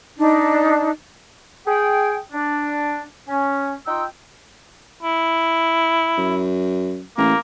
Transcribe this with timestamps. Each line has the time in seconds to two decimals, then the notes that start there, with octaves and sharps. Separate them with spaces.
0.17 D4 D#4
1.66 G#4 G5
2.32 D4
3.28 C#4
3.86 D#4 F4 G5 E6
5.03 E4
6.18 F#2
7.17 A1 A#3